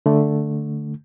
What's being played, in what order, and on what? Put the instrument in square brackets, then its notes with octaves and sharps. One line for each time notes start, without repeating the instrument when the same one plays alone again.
[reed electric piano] D3 A3